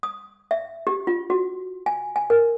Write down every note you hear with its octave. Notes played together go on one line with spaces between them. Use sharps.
D#6
E5
G4
F4
F#4
G#5
G#5
A#4